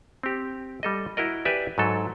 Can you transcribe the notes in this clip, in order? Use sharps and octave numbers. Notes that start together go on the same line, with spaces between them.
C4 G4
G3 A4 D#5
E4 F#4 A#4 D#5
G4 B4 D5 E5 G#5
G#2 F#3 A4